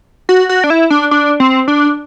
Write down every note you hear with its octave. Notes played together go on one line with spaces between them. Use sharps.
F#4
F#4
D4
E4
D4
D4
C4
D4